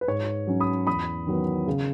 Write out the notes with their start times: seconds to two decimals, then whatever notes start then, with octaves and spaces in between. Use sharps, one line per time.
0.01 B4
0.08 G#2 C#5
0.47 F#3 C#4
0.60 B5 D#6
0.87 E2 B5 D#6
1.27 D#3 F#3 B3
1.67 C#3